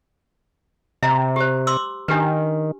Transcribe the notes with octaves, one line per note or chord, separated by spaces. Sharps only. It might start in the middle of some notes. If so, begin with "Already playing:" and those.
C3 E5 A#5
G4 C5
C6 D6 E6
D#3 D4 G4 B4